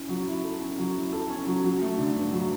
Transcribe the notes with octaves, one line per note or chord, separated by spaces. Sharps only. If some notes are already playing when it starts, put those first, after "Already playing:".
Already playing: C#4 E4
F#3
E4
A4
C#4
F#3
E4
A4
C#4
F#3
F#3
A3
D3
G2
F#3